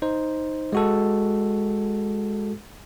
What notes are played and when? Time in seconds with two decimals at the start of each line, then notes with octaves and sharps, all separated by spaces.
0.02 D#4 C5
0.73 G#3 F#4 A4